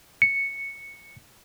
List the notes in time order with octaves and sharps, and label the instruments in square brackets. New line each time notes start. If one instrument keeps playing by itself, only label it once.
[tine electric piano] C#7